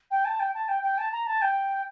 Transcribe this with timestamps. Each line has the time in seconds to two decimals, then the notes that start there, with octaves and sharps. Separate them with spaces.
0.11 G5
0.25 A5
0.40 G5
0.54 A5
0.68 G5
0.83 G5
0.98 A5
1.12 A#5
1.26 A5
1.42 G5